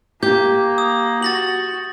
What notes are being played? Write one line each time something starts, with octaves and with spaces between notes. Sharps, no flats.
A#3 G4 G6
D#6
F#4 A6 A#6 F#7